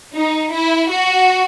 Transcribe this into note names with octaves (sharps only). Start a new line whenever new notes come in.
D#4
E4
F#4